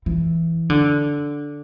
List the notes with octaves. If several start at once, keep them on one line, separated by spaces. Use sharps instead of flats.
E3
D3